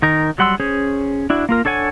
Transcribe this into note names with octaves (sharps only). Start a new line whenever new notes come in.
D#3 D#4 A#4
F#3 G3 F#5 C6 E6
C#4 G#4 C5 C#5
D4 E4 F#4
A#3 F4 A#4
D4 A4 C#5 F#5 G#5